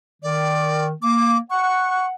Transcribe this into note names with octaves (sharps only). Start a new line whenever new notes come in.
D#3 D5
A#3 D6
F#5 C#6